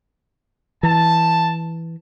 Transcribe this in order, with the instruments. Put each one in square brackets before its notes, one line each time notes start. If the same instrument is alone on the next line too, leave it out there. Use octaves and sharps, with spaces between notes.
[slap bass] E3 [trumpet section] A5